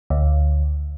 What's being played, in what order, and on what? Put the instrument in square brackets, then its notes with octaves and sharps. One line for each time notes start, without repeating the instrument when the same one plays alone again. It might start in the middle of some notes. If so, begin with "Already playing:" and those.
[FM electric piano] D2